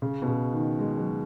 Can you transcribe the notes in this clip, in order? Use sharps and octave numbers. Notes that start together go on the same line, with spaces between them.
C#3
B2
C#3
D#3
G#3
F#3